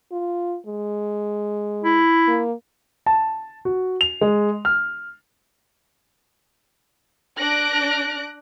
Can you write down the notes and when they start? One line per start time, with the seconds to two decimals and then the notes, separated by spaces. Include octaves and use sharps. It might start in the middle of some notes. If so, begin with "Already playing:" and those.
0.11 F4
0.67 G#3
1.84 E4
2.27 A#3
3.06 A5
3.65 F#4
4.01 F7
4.21 G#3
4.65 F6
7.38 D4 F#6 A#6 D7